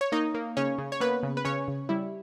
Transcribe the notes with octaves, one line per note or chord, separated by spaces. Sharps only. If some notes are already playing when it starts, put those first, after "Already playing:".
C#5
A#3 D#4 D#5
A#3
C#3 C#4 C#5
C#3
C#5
A#3 B3 B4
C#3
B4
C#3 C#4 C#5
C#3
G3 E4